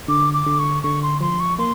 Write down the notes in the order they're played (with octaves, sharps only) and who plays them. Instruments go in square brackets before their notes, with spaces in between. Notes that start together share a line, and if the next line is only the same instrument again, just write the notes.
[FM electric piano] D3 [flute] D6
[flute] D6
[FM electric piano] D3
[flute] C#6
[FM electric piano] D3 [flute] C#6
[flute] C6
[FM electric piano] F3 [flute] C6
[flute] C#6
[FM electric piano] A#3 [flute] C6